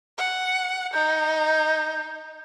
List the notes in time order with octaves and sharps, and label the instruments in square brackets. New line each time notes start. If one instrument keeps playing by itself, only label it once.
[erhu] F#5
[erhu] D#4 [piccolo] G6